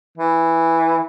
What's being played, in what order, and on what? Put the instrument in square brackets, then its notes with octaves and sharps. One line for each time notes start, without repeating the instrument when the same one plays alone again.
[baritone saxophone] E3